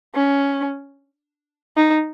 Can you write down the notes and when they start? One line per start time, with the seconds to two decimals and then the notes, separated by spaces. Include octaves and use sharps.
0.15 C#4
1.76 D#4